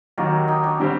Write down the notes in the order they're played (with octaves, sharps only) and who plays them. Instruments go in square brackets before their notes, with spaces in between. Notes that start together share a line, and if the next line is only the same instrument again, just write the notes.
[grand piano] D#2 D#3 F#3 [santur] G4 A#4
[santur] D#4 G4
D4 F#4
[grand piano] D3 G3 C4 G4